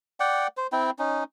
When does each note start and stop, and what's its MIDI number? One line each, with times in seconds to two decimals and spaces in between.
0.20 0.47 74
0.20 0.47 78
0.20 0.47 79
0.57 0.67 72
0.72 0.91 60
0.72 0.91 64
0.72 0.91 79
0.99 1.24 61
0.99 1.24 63